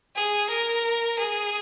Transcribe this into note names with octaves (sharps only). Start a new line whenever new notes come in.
G#4
A#4
G#4